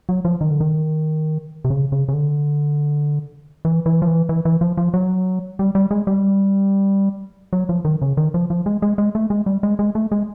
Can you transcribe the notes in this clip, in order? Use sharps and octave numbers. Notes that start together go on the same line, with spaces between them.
F#3
F3
D#3
D3
D#3
C3
C#3
C#3
C#3
D3
E3
E3
F3
E3
E3
E3
F3
F3
F#3
G3
G3
G#3
G3
F#3
F3
D#3
C#3
D#3
F3
F3
G#3
G#3
G#3
A3
G#3
G3
G#3
G#3
A3
G#3